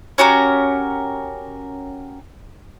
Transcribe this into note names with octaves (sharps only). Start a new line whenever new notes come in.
C#4 F#4 G4 A#4